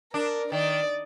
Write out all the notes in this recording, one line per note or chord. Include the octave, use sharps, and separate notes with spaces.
D4 A#4
D#3 D5